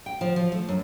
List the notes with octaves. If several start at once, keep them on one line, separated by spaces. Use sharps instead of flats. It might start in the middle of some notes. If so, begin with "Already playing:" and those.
G5
F3
F3
A3
F#2